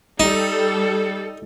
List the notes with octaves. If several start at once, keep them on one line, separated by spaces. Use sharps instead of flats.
G3 D#4 A4